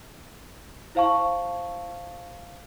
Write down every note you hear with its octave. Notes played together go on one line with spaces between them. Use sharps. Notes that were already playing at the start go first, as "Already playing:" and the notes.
E4 C5 F5 A5 C#6